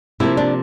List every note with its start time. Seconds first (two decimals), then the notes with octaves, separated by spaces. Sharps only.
0.20 C3 F3 A#3 E4
0.37 D4